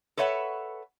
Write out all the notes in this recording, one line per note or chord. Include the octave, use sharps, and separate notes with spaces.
A4 B4 C#5 E5 F#5